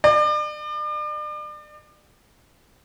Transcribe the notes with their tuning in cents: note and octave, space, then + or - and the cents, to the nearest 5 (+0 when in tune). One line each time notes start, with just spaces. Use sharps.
D5 +40